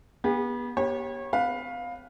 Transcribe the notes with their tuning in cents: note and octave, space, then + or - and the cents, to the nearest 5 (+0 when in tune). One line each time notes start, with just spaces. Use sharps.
B3 -30 G4 +45
B3 -40 G4 +0 C#5 -25
C4 -45 B4 +0 F5 +20